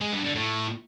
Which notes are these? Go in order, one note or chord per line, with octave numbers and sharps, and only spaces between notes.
G#3
G2
D3
A2